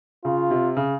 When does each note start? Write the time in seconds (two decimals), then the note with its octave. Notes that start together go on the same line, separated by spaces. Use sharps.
0.25 C#3 F4
0.51 C3
0.77 C#3